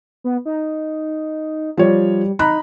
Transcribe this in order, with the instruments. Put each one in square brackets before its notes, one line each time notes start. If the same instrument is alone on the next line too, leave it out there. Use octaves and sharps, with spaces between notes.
[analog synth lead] B3
D#4
[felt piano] F3 C#5 [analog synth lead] G3
[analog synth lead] D#4 [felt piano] A#5 B5 F#6